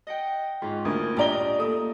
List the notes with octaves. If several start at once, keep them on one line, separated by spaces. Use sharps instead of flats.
D#5 F#5 G5
G#2 C#4 F4
D2 G#2 A#3 D#6
A#1 G4 D5 D#5 F5 A#5 D#6 G7
A3 A#3 D#6